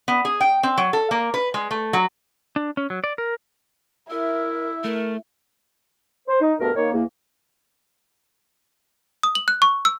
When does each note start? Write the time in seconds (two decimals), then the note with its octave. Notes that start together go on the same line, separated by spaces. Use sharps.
0.08 B3
0.25 G#4
0.41 G5
0.63 C4
0.78 F#3
0.93 A4
1.11 A#3
1.34 B4
1.54 G#3
1.71 A3
1.93 F#3
2.56 D4
2.77 C#4
2.90 F#3
3.04 D5
3.18 A#4
4.11 E4 A#4 E5
4.84 A3 A#4
6.28 C5
6.41 D#4
6.60 G2 B2 A3 B3 A#4
6.75 D#3 A#3 C#5
6.93 E2 A#3
9.23 D#6
9.35 F#7
9.48 F#6
9.62 C#6
9.85 E6